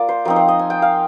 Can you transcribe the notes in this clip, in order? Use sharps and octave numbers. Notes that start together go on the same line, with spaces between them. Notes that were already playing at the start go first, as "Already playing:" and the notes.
Already playing: A#3 F4 A#4 D5
C5
F3 C4 D#4 A#4
C5
D#5
G#5
G5
F5